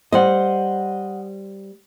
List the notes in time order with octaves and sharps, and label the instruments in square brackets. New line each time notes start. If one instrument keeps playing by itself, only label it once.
[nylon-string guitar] G3 C5 [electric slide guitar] D#5 F#5